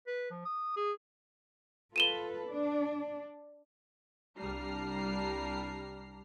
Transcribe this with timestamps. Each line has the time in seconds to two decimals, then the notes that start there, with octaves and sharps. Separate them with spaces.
0.07 B4
0.31 F3
0.45 D#6
0.76 G#4
1.96 F4 A4 B4 D#7 E7 G7
2.50 D4
4.38 C2 G3 D4 A#5 F6 C7